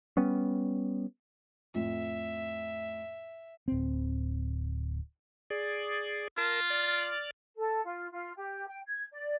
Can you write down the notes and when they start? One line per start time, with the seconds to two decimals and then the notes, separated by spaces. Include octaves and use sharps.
0.17 G3 B3 C#4
1.74 F2 A2 E5
3.68 D1 C4
5.50 G#4 D5
6.37 F4 A#4 A5 A#6
6.70 D5 F6
7.57 A4
7.84 F4
8.11 F4
8.37 G4
8.66 G5
8.87 G#6
9.11 D5